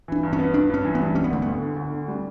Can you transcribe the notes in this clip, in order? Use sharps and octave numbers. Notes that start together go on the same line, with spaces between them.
E3 D4
G2
C#4
B3
G2 D4
G2 C#4
E3
B3
G3
G3 C#4
B3
D2 A3
D2 B3
D3
D2
D3
G3